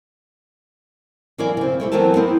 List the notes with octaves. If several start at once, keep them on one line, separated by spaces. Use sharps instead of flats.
E3 F#3 A#3 E4 D5 G#5
C#3 C4
G3 A3 E4
E3 F#3 B3 C4 A#4 A5
B3 C4 E4 A#4